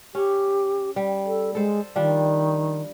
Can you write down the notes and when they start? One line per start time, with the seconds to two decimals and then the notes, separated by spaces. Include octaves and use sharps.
0.15 C#4 G4
0.96 G3
1.26 A4
1.55 G#3 A4 C5
1.96 D#3 F3 G3 D4